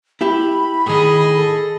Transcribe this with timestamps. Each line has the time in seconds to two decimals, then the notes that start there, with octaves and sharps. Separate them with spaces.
0.21 E4 G4 E5 B5
0.86 A2 D#3 G#4 D#5
1.36 A4